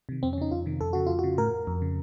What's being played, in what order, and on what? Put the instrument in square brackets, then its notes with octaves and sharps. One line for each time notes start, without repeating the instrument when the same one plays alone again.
[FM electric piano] C3 D#3
F2 C4
C#4
C#3 D#4
F2 F4
C3 D#3
F2 A4
C#3 F#4
F2 F4
F#4
C#3
A2 A#4
F2
C#3